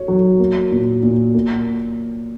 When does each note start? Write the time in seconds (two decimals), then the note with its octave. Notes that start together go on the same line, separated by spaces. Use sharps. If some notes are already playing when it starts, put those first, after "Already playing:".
Already playing: F#4 C#5
0.08 F#3
0.39 A#3
0.71 A#2
1.03 A#2
1.34 A#3